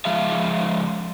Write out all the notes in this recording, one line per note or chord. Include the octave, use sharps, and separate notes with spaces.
F3 G#3 E5 F5